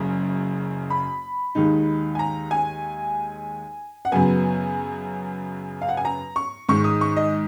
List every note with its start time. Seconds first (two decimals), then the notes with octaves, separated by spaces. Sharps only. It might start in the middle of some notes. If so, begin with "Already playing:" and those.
Already playing: F#1 F#2 C#3
0.90 B5
1.55 D#2 D#3 G#3 D#4
2.15 G#5
2.19 A#5
2.51 G#5
4.05 F#5
4.12 F#2 C#3 F#3 B3 G#5
5.82 F5
5.89 F#5
5.97 G#5
6.05 A#5
6.36 C#6
6.69 G#2 D#3 G#3 C#6
6.84 D#6
7.01 C#6
7.16 D#5